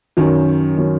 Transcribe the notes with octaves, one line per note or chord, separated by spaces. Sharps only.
F#2 D#3 F#3 C#4
D#3 F#3 C#4